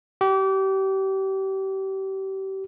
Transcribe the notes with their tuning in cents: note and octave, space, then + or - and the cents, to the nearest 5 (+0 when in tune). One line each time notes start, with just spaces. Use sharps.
G4 -30